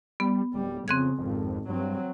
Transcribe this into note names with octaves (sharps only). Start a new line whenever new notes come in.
G3 B3
D1 G3
F2 C#3 C4 F#6 G#6
G#1 F2
G2 F#3 C4